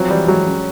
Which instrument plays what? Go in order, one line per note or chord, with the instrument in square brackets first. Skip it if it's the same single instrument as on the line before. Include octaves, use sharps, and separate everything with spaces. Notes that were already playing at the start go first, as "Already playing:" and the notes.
Already playing: [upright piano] F3 C4 [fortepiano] F#3
[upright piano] E3 [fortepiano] G3
[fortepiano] F#3 [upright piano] G#3
[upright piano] C#4